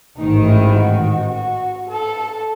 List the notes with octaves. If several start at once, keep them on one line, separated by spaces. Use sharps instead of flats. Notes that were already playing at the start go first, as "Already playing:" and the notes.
A1 G#2 D#3 D#4
E4
F#4
F#4
A4